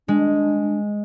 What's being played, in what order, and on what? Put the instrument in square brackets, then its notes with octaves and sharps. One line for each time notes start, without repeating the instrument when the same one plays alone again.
[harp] G#3 [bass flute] D4